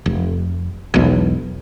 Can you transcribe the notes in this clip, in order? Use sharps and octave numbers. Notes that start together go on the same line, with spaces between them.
F1
E1 B1